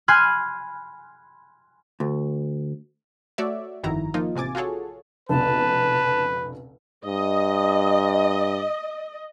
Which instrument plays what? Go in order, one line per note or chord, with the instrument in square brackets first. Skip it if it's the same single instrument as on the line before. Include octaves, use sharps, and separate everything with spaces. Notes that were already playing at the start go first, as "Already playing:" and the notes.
[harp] G#5 B5 C6 F6 F#6 G#6
[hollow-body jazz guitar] D2
[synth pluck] A3 F#4 C#5 D5 E5
G1 F2 D#3 E4 F#4 A#5
F3 A#3 D#4 F4
A1 C3 G#5 D6 A6
F4 F#4 G#4 A4 C#5
[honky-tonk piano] F1 C#2 B2 [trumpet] B4 [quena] A5
[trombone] G2 [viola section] D#5